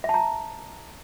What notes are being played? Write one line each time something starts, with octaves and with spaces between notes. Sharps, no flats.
E5 A5 A#5